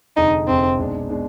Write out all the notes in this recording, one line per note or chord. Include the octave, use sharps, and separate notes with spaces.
F1 F2 D3 G#3 D#4
F1 F2 D3 G#3 C4
B1 B2 G#3 D4
B2 G#3 D4